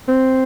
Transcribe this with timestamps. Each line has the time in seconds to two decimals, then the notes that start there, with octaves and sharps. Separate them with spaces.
0.08 C4